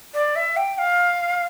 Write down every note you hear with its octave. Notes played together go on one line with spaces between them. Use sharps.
D5
E5
G5
F5